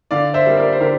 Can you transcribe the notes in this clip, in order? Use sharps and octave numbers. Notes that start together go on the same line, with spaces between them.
D3 D5 F5
C5 E5
G3 A#3
A#4 D5
C5
D3 G4 A#4